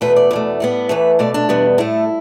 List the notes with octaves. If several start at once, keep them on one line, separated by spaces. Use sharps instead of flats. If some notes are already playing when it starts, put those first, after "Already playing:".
E2 B2 A3 B4
D5
E2 B2 A3
A2 G3 B3
E2 E3 A3 B4
B2 A3 D5
D4
E2 B2 G3 B3
A2 A3 E4